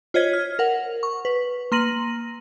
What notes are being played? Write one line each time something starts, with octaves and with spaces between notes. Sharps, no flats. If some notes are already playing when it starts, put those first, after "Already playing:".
F4 C5 C#5 D#5 G#6 B6
F6
A#4 F#5
C#6
B4
A#3 C6 A#6 D#7 F#7